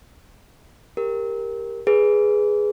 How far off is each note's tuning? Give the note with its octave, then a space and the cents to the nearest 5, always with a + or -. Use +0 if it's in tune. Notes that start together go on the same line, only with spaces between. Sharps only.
G4 +15 A#4 +0
G#4 +0 B4 +0